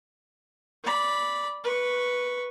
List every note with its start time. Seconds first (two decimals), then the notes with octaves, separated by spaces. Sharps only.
0.84 D5 B5
1.64 B4 C#6